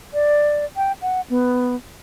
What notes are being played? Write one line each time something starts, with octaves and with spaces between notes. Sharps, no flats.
D5
G5
F#5
B3